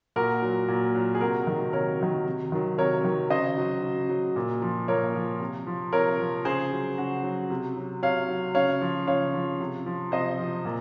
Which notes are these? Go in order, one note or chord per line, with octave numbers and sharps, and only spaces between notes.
A#2 F#4 A#4
F#3
A#2
F#3
G#4
C3 F#4 A#4
D#3 F#3
C3 A#4 C#5
D#3 F#3
C3
D#3 F#3
C3 A#4 C#5
D#3 F#3
C#3 C5 D#5
F#3
C#3
F#3
A#2
F3
A#2 A#4 C#5
F3
C3
F3
C3 A#4 C#5
F3
C#3 G#4 C5
F#3
C#3 F#4
F#3
C3
F#3
C3 C#5 F5
F#3
C#3 C#5 F5
F3
C#3 C#5 F5
F3
C3
F3
C3 C5 D#5
F3
A#2